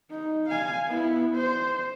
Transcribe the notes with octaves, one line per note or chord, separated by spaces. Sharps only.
D#4
F5 G#5
B3 E4
C5